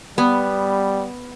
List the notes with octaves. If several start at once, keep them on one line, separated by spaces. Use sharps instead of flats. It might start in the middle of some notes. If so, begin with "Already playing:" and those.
G3 B3